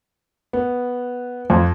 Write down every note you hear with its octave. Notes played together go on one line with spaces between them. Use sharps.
B3
F2